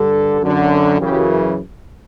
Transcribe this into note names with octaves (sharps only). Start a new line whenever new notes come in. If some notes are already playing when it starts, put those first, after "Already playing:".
Already playing: G2 D3 A4
F#2 D3
F#2 C#3 E3 G4